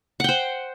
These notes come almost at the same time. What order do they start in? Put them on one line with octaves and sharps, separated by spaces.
F#5 G5 C5